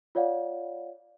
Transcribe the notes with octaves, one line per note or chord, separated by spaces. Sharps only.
F4 C#5 D5 F5 F#5